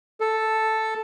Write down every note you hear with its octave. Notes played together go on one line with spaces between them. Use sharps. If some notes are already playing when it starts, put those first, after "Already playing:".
A4